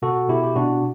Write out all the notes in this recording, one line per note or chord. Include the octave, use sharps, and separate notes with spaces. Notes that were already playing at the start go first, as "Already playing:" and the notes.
B2 F#4 A4
B2 E4 G4
G4
B2 D4 F#4